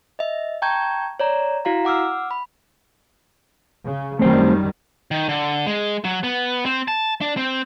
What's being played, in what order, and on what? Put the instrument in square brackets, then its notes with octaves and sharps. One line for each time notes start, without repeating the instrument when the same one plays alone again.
[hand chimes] D#5 E5
G5 A5 A#5 C#6 G6 G#6
C#5 D5 A#5
E4 F#4 F5 A#5
F#5 D6 E6 F6
B5
[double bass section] C#3
[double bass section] F#2 D#3 G3 [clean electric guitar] A3 C4 C5
[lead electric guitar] D#3
D3
G#3
F#3
B3
C4
A5
D4
C4